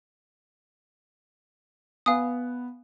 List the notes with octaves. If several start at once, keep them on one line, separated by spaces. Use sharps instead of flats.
B3 F5 G#5 D#6